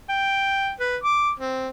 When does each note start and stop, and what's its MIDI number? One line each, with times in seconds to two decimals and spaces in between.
0.09 0.71 79
0.80 0.97 71
1.04 1.31 86
1.39 1.69 60